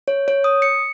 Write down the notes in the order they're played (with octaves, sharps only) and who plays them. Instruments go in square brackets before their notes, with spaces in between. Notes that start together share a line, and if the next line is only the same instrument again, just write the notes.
[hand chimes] C#5
C#5
D#6
C#7